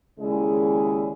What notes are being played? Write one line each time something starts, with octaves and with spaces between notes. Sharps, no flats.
D#2 C#3 G#3 E4 G#4 D5